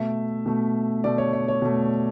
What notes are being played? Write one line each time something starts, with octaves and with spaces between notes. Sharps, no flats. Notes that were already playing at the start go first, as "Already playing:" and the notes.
Already playing: B2 A3 E5
B2 A3
B2 A3 D5
C#5
C#5
C#5
B2 A3